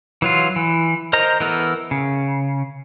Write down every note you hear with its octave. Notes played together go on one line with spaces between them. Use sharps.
E3 F#3 F4
E3
A#4 C5 D#5 A#5
E3 B3 A4 A#4
C#3